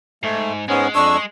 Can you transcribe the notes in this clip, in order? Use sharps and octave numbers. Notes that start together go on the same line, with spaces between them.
G#2 A3
G#2 G#3 B3 C#4
F2 D4 C#6 E6